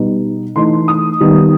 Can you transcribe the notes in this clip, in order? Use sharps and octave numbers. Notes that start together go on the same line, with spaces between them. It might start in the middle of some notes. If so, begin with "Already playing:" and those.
Already playing: B2 G3 B3 D#4
E3 A3 D#4 C6
D#6
D#3 G3 B3 D#4